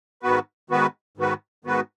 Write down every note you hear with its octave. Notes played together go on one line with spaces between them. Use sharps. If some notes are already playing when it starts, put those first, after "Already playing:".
G#2 D#3 B3 F#4 B4
G#2 D#3 B3 F#4 B4
G#2 D#3 B3 F#4 B4
G#2 D#3 B3 F#4 B4